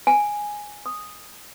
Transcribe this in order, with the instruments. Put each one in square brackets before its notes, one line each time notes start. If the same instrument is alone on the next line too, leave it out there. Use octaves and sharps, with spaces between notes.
[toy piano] G#5
D#6